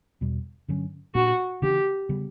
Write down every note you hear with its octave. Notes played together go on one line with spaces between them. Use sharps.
E2 B2 G3
G2 D3 F#3 C#4
A#2 A#3 D4 F#4
C#3 E3 A#3 D4 G4
C#3 G3 B3